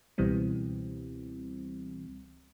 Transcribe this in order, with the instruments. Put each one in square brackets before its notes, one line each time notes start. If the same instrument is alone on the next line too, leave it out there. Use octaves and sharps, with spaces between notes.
[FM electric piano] C#2 B2 E3 G3 C4